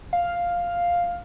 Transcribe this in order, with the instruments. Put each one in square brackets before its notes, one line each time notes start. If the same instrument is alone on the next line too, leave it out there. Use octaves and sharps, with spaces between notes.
[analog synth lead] F5